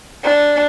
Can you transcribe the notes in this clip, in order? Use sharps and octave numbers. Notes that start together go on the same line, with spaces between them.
D4